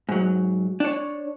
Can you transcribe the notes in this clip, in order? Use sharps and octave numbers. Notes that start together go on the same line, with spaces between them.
G#2 F#3
D4 C#5